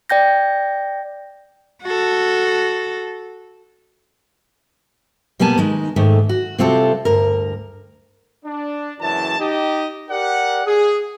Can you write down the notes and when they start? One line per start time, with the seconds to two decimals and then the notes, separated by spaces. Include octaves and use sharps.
0.10 D5 G5 G6 A#6
1.83 F#4 A4
5.39 B2 G3 A#3 B3 G#5 A5
5.58 D#3 G#3 D#4
5.96 G#2 D#3 A3
6.29 F#4
6.58 C3 G3 C4 F4 F#4 A4
7.05 D2 G2 A#4
8.45 D4
9.00 F#1 F#2 E3 A5
9.39 D#4 G4 D#5
10.10 G4 A#4 D5 F#5
10.66 G#4